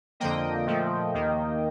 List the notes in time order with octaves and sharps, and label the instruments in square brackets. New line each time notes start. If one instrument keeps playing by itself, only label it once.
[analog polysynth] F2 D3 F3 A#3 D#5 G5
A#2 F3 A3
D#2 D#3 A#3